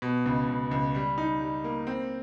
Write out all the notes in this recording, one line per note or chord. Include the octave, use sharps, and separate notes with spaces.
B2
C#2
C#2
C#2
G3
D#4
G3
A#3
C4